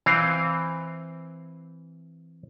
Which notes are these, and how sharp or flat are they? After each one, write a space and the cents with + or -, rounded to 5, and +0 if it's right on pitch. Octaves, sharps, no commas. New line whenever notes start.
E3 +0 C4 +0 F5 +0